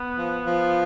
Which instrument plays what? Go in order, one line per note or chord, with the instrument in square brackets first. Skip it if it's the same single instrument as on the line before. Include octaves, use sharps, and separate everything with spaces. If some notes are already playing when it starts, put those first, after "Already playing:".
Already playing: [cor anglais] B3
[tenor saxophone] F3
F3